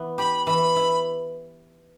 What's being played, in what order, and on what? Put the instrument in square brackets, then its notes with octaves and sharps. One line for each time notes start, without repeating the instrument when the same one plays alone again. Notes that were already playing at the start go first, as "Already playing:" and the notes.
Already playing: [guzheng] E3 B3
[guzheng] G4 [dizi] B5
[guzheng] E3 [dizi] B5
[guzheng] E4